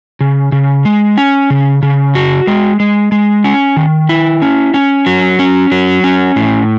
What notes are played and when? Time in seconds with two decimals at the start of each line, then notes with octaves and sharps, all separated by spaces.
0.21 C#3
0.52 C#3
0.85 G#3
1.18 C#4
1.50 C#3
1.83 C#3
2.15 F#4
2.47 G#3
2.80 G#3
3.12 G#3
3.44 C#4
3.77 D#3
4.09 E4
4.42 C#4
4.74 C#4
5.06 F#3
5.39 C#4
5.72 F#3
6.04 C#4
6.36 A2